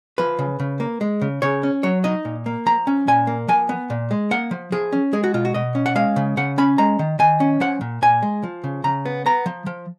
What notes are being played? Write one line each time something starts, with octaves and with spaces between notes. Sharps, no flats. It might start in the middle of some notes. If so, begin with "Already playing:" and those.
F3 B4
C#3
C#3
A#3
G#3
C#3
C#3 C#5
C#4
F#3 C#5
D#4 D#5
A#2
A#3
F3 A#5
C#4
A#2 G#5
A#3
F3 G#5
B3
A#2
G#3
A#3 F#5
F3
F3 G#4
C#4
G#3 G#4
F#4
B2 F4
F#4
B2 D#5
C#4
F#5
G#3 F5
C#3
C#3 F#5
C#4 B5
G#3 A#5
D#3
D#3 G#5
C#4
F3 F#5
A#2
A#2 G#5
G#3
F3
C#3
C#3 A#5
B3
B3 A#5
F3
F3